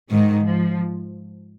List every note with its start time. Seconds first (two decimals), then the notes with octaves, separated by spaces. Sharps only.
0.11 G#2 D#3
0.44 F3